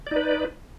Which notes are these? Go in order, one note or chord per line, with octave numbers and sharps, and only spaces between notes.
D#4 B4 D5